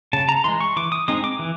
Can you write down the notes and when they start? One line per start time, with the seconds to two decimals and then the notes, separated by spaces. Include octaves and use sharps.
0.13 C#3 A5
0.29 A#5
0.44 E3 G#3 C6
0.60 C#6
0.76 E3 D6
0.92 D#6
1.08 G#3 C4 D#4 D#6
1.24 D6
1.39 E3